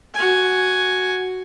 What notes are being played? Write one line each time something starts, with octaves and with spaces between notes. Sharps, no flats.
F#4 G#5